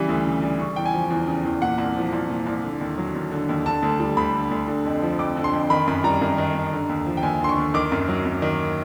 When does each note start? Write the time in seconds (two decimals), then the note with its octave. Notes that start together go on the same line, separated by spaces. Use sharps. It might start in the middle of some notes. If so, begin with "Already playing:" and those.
Already playing: C#3 E3 G3
0.09 D2
0.25 C#3
0.42 G3
0.60 C#3 C#6
0.76 E2 G5
0.86 G#5
0.93 F3
1.10 E2
1.27 C#3
1.45 E2
1.62 A#2 F#5
1.78 C2
1.96 F3
2.13 C2
2.30 A#2
2.46 C2
2.64 D3
2.81 D#2
2.98 F#3
3.15 D#2
3.32 D3
3.49 D#2
3.66 D3 A5
3.83 D2
4.00 G3
4.17 D2 B5
4.34 D3
4.51 D2
4.68 D3
4.85 F2
5.02 F3
5.19 F2 D6
5.36 D3
5.44 C6
5.54 F2
5.70 D#3 B5
5.87 F#2 B5
6.04 G3 A#5
6.21 F#2
6.38 D#3
6.55 F#2
6.72 D3
6.89 D#2
7.06 F3
7.17 G5
7.23 D#2 G#5
7.41 D3 C6
7.49 C#6
7.58 D#2
7.74 D#3 D6
7.92 F#2
8.08 F#3
8.25 F#2
8.42 D#3